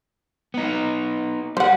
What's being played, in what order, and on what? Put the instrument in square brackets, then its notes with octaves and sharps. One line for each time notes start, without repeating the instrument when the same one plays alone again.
[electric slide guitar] B3 D#4
[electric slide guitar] G3 [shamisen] C5 F#5